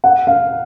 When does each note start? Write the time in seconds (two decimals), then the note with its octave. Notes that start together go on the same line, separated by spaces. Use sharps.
0.04 F#5
0.27 F5